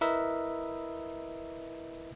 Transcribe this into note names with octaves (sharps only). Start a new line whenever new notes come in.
E4 A#4 B4 D#5 E5